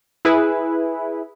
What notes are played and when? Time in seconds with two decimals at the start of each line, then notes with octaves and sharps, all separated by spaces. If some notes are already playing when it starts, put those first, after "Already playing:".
0.25 E4 G#4 B4